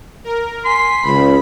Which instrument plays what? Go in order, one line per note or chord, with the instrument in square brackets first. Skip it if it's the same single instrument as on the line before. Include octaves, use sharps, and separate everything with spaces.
[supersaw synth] A#4
[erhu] G#5 [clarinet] C6 [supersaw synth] B6
[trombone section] C#2 [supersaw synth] C#3 [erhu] B5